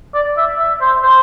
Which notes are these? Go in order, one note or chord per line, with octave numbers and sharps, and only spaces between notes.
D5
E5
E5
C5
C5